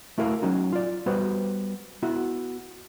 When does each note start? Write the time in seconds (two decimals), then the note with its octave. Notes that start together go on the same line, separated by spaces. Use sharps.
0.18 A3 E4 F#4 A#4 F5
0.42 F#3 C#4 D#4 F#4
0.73 F4 D5
1.06 G3 B3 F#4 B4 C5
2.02 B3 E4 F#4